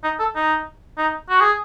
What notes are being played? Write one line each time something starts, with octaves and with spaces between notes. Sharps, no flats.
D#4
A4
D#4
D#4
F#4
G#4